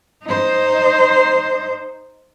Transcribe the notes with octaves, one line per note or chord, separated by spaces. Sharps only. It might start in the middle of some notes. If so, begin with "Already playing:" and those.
D#4 C5